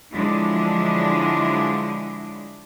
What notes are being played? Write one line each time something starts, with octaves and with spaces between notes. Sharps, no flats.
D3 F3 F#3 G#3 D4 E4